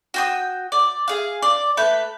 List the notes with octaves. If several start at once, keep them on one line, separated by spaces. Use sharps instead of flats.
F#4 G5 D#6
D5
G#4 F5
D5
A3 B4 G6